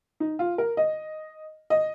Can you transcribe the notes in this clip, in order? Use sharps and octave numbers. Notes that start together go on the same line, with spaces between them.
D#4
F4
A#4
D#5
D#5